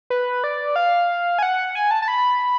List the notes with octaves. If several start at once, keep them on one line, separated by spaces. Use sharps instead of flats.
B4
D5
F5
G#5
F#5
G#5
A5
A5
B5